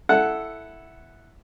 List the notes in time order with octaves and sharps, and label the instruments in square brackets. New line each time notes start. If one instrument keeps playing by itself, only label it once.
[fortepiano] E4 A4 F#5